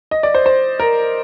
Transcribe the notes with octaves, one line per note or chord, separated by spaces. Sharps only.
D#5
D5
C5
C5
A#4